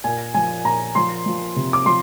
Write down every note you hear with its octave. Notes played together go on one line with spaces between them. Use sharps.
A#2 G#5
F3 G#5
A#2 A#5
F3 C6
F3
C3
D6
F3 C6